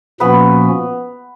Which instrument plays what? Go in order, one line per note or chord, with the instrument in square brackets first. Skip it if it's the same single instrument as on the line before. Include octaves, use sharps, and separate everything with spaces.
[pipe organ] A#2 F3 A#3 C#4 F#4 [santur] B3 B4